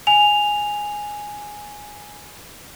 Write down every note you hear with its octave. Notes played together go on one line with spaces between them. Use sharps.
G#5 F7